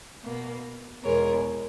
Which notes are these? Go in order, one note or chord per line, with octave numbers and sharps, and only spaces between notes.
B2 A#3
E2 B2 G#3 A#4 C#5